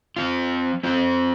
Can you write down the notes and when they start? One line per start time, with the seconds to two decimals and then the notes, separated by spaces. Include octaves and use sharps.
0.17 F3 C4 F4
0.83 F3 C4 F4